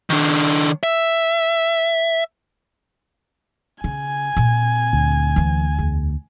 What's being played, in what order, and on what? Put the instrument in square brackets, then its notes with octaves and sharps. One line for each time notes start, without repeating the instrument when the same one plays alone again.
[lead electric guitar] D#3 D4
E5
[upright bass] C#3 [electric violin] G#5
[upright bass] A#2 C4
[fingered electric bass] D2
[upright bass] E3 A#3
E2